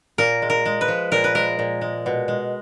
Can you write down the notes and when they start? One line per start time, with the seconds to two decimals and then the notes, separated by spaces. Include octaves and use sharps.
0.18 A#2 A#4
0.42 G#3
0.50 A#4
0.65 G#3
0.81 B4
0.88 F3
1.12 A#2 A#4
1.24 B4
1.35 G#3 A#4
1.59 A#2
1.81 G#3
2.06 B2
2.28 G#3